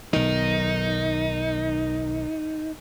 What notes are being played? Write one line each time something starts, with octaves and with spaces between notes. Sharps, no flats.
B1 D#3 D#4